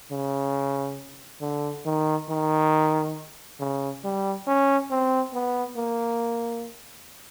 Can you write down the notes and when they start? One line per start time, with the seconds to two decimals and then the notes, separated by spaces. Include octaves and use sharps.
0.11 C#3
1.41 D3
1.85 D#3
2.29 D#3
3.60 C#3
4.04 G3
4.47 C#4
4.91 C4
5.33 B3
5.77 A#3